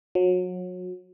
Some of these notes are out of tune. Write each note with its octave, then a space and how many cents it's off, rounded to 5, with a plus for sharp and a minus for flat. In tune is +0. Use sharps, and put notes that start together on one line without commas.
F#3 -30